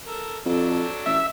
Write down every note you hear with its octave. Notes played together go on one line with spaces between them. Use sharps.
A4 A#4
F2 F#3 D4 A4
A1 E5